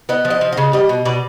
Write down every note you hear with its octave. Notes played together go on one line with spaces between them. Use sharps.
B3 D#5
F3
D#5
F3
C#3 D#5
G3 D#5
B2
B2 D5